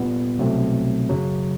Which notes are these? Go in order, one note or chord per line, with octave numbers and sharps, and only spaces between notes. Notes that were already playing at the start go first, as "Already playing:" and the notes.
Already playing: A#2 G3 B3
C2 B2 F#3 A3 C4
F#2 C#3 F#3